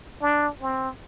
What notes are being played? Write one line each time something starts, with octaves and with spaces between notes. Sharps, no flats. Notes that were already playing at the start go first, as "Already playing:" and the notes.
D4
C4